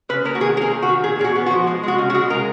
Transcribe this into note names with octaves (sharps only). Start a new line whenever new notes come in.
C#3 B4
A#3 A#4
F#4
D#3 G#4
A#3 G#4 A#4
D#3
F#4
D#3
A#2 G#4
A#2 G#4
F#4
B3
F#4
F3
G#3
G#3 F#4
C#3
F#4
G#3
C#3 A#4